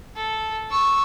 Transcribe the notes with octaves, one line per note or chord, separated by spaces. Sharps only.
A4
C#6 E6